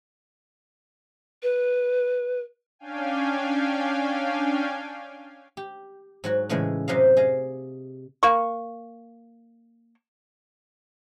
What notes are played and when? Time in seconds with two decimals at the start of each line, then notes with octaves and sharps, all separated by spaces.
1.43 B4
2.79 C#4 D4 F5 G5 G#5
5.57 G4
6.24 G#2 F#3 F#4
6.49 A2 C#3 E3 G#3
6.88 F#2 C3 F#3 D#5 F5
7.17 G#4 D#5 F5
8.23 A#3 C#6